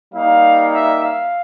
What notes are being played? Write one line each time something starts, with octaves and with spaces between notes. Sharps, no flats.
G3 A#3 D#4 F5
E5
F5